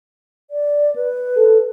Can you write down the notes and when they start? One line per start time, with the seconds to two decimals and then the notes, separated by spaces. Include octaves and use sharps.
0.51 D5
0.96 B4
1.37 A4